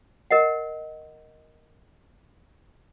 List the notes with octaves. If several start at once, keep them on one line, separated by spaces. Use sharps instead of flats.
A#4 D#5 F#5